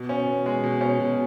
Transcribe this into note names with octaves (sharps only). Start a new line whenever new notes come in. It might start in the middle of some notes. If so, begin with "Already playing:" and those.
Already playing: B2
C#4
B2
G#3
B2
C#4
B2